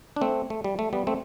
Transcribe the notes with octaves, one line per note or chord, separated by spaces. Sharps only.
D4
A3 C4
A3
G3
A3
G3 B3
A3 C4